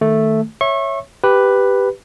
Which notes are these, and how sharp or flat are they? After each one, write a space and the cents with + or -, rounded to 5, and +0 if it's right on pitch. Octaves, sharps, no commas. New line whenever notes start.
D#3 +0 A3 +0
C#5 -10 E5 +0 C#6 -30
G4 +0 B4 +0